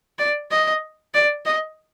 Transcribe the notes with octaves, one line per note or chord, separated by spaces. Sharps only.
D5
D#5
D5
D#5